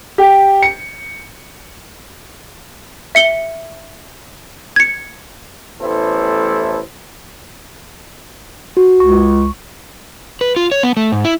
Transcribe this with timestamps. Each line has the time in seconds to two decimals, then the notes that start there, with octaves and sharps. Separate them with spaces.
0.18 G4
0.63 C#7
3.15 E5 C#7 G7
4.76 G#6 C#7
5.81 A1 A2 B3 E4 A4 C5
8.77 F#4
9.00 C#2 C#6
10.41 B4
10.56 F4
10.72 C#5
10.83 B3
10.97 A3
11.12 G#2
11.25 E4